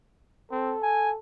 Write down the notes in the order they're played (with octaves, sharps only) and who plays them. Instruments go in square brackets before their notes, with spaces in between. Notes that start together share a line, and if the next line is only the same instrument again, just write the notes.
[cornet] C4 [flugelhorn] A4
[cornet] G#5